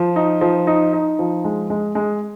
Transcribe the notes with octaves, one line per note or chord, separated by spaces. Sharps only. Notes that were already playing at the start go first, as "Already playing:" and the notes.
Already playing: F3
D#4
F3
D#4
D#4
F3
G#3
G#3
G#3